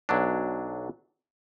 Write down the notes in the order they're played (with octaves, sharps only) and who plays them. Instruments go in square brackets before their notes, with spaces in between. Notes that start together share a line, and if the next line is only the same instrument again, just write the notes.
[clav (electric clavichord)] B1 F#3 D4